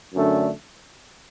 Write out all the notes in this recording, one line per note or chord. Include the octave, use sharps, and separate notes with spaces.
F#2 D3 A3 D4